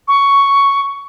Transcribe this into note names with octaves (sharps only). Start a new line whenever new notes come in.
C#6